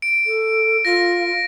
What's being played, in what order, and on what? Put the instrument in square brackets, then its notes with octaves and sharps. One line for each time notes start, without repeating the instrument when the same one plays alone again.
[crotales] D7
[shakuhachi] A4
[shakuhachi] F4 [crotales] A#6